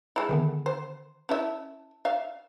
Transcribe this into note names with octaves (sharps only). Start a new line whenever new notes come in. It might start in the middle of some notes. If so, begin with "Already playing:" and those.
G#3 E4 A5
D3 D#3 B3
C5
C#4 E4 E5 A5
E5 F5